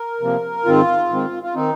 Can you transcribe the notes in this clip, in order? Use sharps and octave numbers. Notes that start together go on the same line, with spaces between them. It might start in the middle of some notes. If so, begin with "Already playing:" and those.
Already playing: A#4
C3 F3 A#3
G#2 D#3 C4 F4
G#2 D#3 C4
F4
D#3 C4 D#4